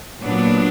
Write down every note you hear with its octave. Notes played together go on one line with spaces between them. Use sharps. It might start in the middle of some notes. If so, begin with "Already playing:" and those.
A#2 F#3 B3 D4